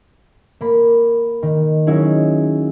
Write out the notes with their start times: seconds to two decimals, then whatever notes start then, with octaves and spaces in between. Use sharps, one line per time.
0.61 A#3 B5
1.42 D#3
1.87 F#3 C#4 D#4 E4 G#4